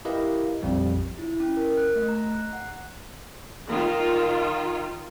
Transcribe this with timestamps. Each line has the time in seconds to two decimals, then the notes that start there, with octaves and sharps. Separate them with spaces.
0.05 E4 G4 A#4 B4 D#5 F5
0.63 A#1 F2 G3
1.19 E4
1.40 C#4
1.57 A#4
1.77 F#6
1.95 A3
2.08 A#5
2.32 F#6
2.53 F#5
3.69 D#3 F4